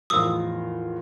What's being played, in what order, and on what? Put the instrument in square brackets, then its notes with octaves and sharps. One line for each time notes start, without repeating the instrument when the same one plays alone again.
[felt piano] E2 A2 F3 [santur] F4 A#4 [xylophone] D#6 E6